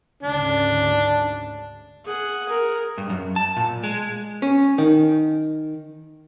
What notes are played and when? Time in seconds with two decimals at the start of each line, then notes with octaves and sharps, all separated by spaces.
0.23 D2 G#2 C#3 D4
2.05 G#4 F#5
2.46 G#4 A#4
2.98 G2
3.10 F#2
3.36 A5
3.56 A#2
3.84 G#3
4.42 C#4
4.78 D#3